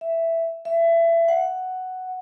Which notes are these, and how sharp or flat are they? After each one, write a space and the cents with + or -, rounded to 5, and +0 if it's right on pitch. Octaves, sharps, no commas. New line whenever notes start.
E5 +5
E5 +25
F#5 +5